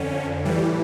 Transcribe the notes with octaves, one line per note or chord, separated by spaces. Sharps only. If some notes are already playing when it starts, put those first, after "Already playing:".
Already playing: F2 D3 C#4
A2 E3 G3